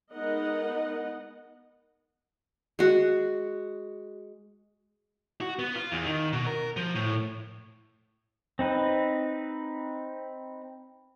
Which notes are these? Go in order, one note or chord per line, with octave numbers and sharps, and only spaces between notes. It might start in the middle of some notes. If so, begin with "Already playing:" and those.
G#3 B3 D#4 A#4 D#5 F#5
G#3 F#4
F#4
B3
F4
E2
D#3
B2
A#4
F3
A2
C4 D#4 B4